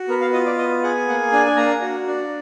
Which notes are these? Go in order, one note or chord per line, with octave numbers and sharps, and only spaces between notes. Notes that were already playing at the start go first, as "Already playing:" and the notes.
Already playing: F#4
B3 A#4
F5
F4 D#5
D5
B3 D#5
G#4 F#5
A#3 F#5
D4 G#5
G#5
A#3 A#5
F#4
D4